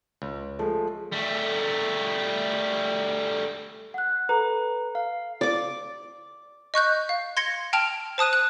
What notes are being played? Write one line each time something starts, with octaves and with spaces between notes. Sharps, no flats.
C#2
F3 G#3 A3
G3 A3
F#5 F#6
A4 B4 A#5
F5
D5 D6
D#5 C#6 F#6 G6
F5
C6 G#6 A#6 C#7 G7
G5 A5 F6 D7 F7
C5 A5 D#6 F#6 D#7
F#6